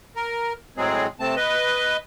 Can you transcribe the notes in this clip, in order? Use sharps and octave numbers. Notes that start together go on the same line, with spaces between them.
A#4
A2 F#3 G#3 C4 G#4
C3 A3 C4 A5
B4 D#5